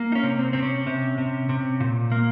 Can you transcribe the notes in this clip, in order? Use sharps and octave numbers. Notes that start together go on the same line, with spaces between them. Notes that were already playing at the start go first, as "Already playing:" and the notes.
Already playing: A#3
D#4
C#4
C3
C4
C3 C4
C#4
C3
C3
C3
A#2
A#3